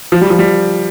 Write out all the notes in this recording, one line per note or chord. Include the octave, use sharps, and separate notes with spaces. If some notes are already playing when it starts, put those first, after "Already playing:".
F3
G3
F3
G3